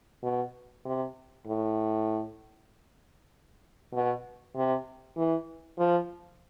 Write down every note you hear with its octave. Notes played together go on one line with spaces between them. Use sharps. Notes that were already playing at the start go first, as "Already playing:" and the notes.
B2
C3
A2
B2
C3
E3
F3